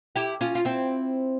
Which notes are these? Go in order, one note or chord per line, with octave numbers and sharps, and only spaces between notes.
E4 G4
C#4 F4
F4
C4 E4